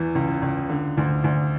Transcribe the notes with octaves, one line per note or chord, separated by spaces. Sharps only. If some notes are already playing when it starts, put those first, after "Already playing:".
Already playing: E2 E3
C#2
C#2
D3
D2
D2